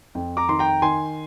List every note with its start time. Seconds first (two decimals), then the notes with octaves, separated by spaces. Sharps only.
0.15 F2
0.37 A#5 D6
0.49 D#3 C6
0.59 G5 A#5
0.82 D#3 G#5 C6